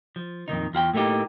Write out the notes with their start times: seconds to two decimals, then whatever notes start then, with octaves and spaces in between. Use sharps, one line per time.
0.16 F3
0.48 F2 A#2 D#3 D#4
0.74 E2 F4 F#5 G5
0.93 A2 A3 A#3 D#4 G4